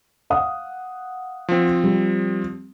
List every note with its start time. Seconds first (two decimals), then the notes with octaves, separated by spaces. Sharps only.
0.30 F5 F#5 D#6
1.49 F3 C4
1.84 G3